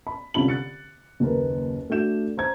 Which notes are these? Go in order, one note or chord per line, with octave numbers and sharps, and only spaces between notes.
B5
C2 D3 C#4 F4 B5 F#7
F#6 A6 C#7
F#1 D#2 A#4 B4
A3 D4 F#4 G6 E7
C5 A#5 G#6